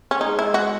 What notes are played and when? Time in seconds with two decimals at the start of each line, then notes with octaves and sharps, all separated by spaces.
0.11 C#4
0.21 G#3 D#4
0.39 E4
0.54 F#4